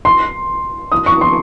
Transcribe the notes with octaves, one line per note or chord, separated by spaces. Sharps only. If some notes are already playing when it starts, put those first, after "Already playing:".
C6
D#6
C#6
C6